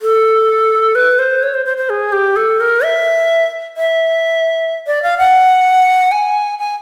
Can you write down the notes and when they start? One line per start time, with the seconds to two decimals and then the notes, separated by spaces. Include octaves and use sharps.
0.02 A4
0.95 B4
1.19 C5
1.43 C#5
1.54 C5
1.65 C5
1.77 C5
1.89 G#4
2.12 G4
2.36 A4
2.60 A#4
2.84 E5
3.77 E5
4.87 D5
5.03 F5
5.18 F#5
6.11 G#5
6.59 G#5